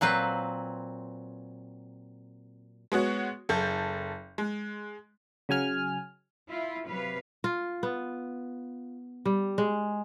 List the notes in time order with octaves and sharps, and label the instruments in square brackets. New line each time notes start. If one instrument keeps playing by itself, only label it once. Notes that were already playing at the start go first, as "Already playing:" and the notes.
[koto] A#2 F#3 C4 B4
[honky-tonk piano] G#3 B3 F#4 C#5
F#1 A4 G6
G#3
[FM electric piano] C#3 F#3 G#5 F6
[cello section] E4 F4
C3 F#3 B4 F5
[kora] F4
B3
G3
G#3